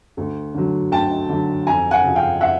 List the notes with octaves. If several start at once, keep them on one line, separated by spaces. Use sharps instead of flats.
D2
D3 F#3
D2 G5 A5
D3 F#3
F2 G#5 A#5
F#5 G#5
C#3 F3
F5 G5
E5 F#5